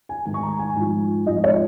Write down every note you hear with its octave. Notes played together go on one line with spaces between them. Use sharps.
G#5
G#2 D#3 G#5
C#6
A#5
G#5
G#2 F3
G#2 F3 D#5
C#5